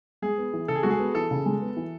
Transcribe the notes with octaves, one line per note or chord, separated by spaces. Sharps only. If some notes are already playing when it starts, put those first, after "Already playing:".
G#3 G#4
B3
E3
C#3 A4
G#4
G#3 F#4
G#4
B3
E3 A4
C#3
G#3
B3
E3